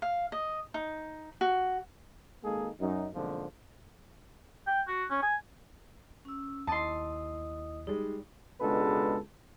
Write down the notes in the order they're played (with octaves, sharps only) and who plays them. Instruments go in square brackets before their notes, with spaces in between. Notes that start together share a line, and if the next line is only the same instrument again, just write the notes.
[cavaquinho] F5
D#5
D#4
F#4
[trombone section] G#1 G#3 A#3 D#4 G#4 A4
F#2 D#4
B1 F2 G#2 D3 F3 A#3
[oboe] G5
F#4
C#4
G#5
[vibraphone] C#4 E6
[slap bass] D#2 [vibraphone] E4 D#5 D#6 [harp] A5 C6
[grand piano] G3 G#3 [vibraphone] D#4
[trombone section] C#2 B2 G#3 D4 A4 B4